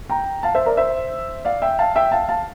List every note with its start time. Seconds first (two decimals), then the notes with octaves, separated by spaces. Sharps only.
0.09 G5 A#5
0.43 F5 A5
0.55 C5 E5
0.66 A#4 D5
0.77 C5 E5
1.45 D5 F5
1.62 E5 G5
1.79 F5 A5
1.96 E5 G5
2.12 F5 A5
2.28 F5 A5